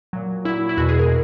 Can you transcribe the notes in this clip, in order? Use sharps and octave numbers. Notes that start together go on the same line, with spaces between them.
A#2 F#3
A#2 F#3 E4
E4
E2 B2 G#3 F#4
G#4
A#4